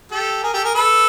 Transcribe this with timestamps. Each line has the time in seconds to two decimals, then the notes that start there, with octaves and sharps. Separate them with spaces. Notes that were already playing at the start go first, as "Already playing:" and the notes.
0.11 G4 A4
0.43 G#4 A#4
0.53 G4 A4
0.64 G#4 A#4
0.75 A4 B4